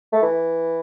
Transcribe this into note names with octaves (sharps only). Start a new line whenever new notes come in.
A3
E3